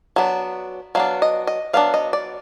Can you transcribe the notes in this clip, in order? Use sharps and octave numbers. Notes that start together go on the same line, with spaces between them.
F#3 B3 D4
F#3 B3 D4 F5
D#5
D#5
F#3 B3 D4 F5
D#5
D5